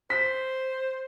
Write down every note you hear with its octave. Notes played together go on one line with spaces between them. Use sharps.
C5 B6